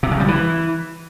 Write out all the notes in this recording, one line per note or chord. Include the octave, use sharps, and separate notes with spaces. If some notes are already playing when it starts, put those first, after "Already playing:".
C3
C#3
G3
E3